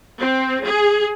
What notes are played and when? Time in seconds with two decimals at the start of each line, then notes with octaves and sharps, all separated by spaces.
0.19 C4
0.64 G#4